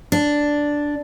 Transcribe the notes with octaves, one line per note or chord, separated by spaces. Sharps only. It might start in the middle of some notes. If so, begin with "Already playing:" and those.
D4